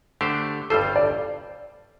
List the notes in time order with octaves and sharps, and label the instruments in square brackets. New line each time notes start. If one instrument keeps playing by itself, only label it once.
[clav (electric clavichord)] D3 A3 D4 G4 C5
[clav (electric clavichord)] G1 G2 G3 F4 C5 [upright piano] A4
[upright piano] D5